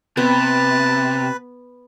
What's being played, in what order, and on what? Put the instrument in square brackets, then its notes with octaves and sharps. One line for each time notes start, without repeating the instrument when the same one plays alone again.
[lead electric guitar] C3 [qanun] B3 [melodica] B4 [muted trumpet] A5